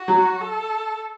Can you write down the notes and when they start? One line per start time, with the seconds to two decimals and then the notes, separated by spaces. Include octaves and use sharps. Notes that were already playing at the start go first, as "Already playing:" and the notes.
Already playing: F#4
0.08 F#3
0.41 A4